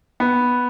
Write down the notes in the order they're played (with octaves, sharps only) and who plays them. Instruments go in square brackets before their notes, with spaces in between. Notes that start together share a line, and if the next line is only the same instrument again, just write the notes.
[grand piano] B3